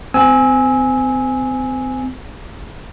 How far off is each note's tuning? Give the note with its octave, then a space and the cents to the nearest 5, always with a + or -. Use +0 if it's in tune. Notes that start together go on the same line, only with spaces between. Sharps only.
C4 -35 G#5 +0 E6 -25